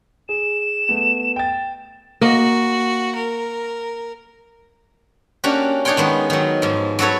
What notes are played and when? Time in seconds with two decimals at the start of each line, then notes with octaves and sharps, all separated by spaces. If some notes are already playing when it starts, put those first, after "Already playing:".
0.29 G#4 E7
0.89 A3 B3
1.36 G5 A6
2.21 A#3 F#4 D#5
3.15 A#4
5.44 A#3 C#4 D4 F#4 G4
5.85 D4 D#4 C#5 F#5 G5 C6
5.97 D#3 G#3 B3
6.30 D#3 F#3
6.62 G#2 F3
6.99 F#3 F#4 A4 B4 C#5